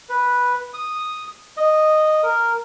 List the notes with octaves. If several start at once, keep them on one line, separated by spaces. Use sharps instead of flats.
B4
D#6
D#5
A#4